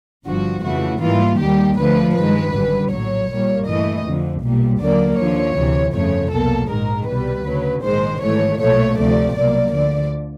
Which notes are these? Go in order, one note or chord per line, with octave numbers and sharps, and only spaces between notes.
G1 G2 D3 F3 F#4
F2 C#3 E3 A3 F#4
G#2 E3 G3 A#3 F4
D#2 D#3 G3 A#3 G4
D2 D3 F3 A3 B4
G2 D#3 G#3 B4
G#1 F#2 D3 G3
A#1 A2 F#3 C#5
A#1 A#2 G3 A#3
G2 E3 A3 D#5
F2 D3 F3
B1 A#2 G3
D#2 D3 F#3 A#3 D5
D#2 D3 F3 C#5
D2 C3 E3
G1 F2 C#3 F3 A3 C#5
C2 B2 F#3 A#3 A4
A#1 G#2 D#3 G#3 A#4
C2 B2 G3 B4
D2 C#3 F#3
A#1 G#2 D#3 G#3 C5
G#1 G#2 E3 A3 C#5
B1 A#2 F3 A3 C#5
D2 C3 F3 A3 D5
C2 B2 F#3 A#3 D5
D2 D3 F3 D5